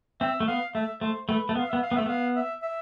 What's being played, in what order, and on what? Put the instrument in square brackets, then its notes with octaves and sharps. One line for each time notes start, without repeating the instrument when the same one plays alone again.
[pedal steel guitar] C4 [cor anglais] E5
[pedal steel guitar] A3
[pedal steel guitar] B3 [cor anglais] F5
[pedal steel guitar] A3 [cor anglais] E5
[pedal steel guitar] A3 [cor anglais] C5
[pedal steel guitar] A3 [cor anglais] B4
[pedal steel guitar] A3
B3
[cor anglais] F5
[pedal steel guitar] B3 [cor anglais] E5
[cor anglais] F5
[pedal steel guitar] B3
[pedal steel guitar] A3 [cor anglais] E5
[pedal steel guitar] B3 [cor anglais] F5
[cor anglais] E5
E5